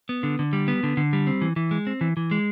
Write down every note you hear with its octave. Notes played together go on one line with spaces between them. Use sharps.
B3
D3
D3
G3
B3
D3
D3
G3
C4
E3
E3
G#3
C4
E3
E3
G#3